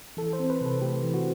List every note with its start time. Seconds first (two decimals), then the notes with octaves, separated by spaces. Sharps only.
0.17 E3 A4
0.33 C5
0.39 C4
0.50 B4
0.61 C3 A4
0.81 A3 G4
1.04 E3
1.14 F#4